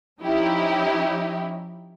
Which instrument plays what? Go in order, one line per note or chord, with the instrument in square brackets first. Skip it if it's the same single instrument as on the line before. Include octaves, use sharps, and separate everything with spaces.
[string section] F3 C#4 D#4 E4 G4